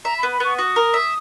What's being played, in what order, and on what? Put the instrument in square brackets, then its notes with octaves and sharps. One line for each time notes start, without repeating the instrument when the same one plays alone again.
[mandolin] E5 [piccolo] A#5
[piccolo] B5
[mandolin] B3
[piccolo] B5
[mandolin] B3 [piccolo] C#6
[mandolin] F#4 [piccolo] D#6
[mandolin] A#4
E5